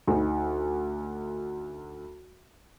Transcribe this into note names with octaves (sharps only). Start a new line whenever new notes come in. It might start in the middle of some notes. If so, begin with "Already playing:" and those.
D2 D#4